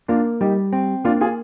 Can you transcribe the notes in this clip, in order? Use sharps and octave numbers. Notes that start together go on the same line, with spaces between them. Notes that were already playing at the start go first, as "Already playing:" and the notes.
A#3 D4 F4
G3 D#4 G4
C4
A#3 D4 F4
F4 G#4